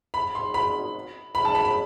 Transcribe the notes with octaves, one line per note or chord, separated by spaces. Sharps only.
B5
C6
B5
B5
A5
B5
B5